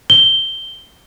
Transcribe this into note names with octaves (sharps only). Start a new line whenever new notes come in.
G7